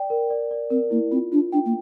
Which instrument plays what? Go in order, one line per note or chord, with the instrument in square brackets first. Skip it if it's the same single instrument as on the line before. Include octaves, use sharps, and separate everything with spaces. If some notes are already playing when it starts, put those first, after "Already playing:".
Already playing: [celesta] D5 G5
A#4
D5
D5
[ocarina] C4 [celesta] A#4
[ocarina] A#3 [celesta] E4
[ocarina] C4 [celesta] F4
[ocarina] D4 [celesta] F4
[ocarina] D4 [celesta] G5
[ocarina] A#3